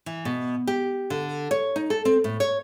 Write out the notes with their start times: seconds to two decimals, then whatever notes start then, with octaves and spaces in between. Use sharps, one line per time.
0.06 E3
0.25 B2
0.67 G4
1.10 D3
1.51 C#5
1.76 D#4
1.90 A4
2.05 C4
2.24 A2
2.40 C#5